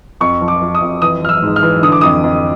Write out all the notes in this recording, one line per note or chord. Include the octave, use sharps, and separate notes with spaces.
F2 C#6
F3
D6
F3
D#6
F2
E3 D#6
E3 F6
E6
G#2
F6
E3
D3 D#6
D6
F2 D#6
F2